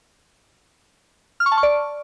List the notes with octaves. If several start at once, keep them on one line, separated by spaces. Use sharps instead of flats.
F6
C#6
A5
C#6
D5